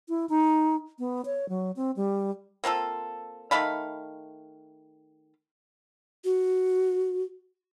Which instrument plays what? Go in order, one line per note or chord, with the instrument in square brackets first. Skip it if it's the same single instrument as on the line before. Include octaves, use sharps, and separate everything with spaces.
[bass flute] E4
D#4
B3
C#5
F#3
C4
G3
[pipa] A#3 C4 F4 A4
D#3 A3 F5 B5
[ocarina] F#4